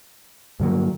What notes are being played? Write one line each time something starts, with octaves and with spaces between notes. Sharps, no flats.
G2 D3 F#3 A#3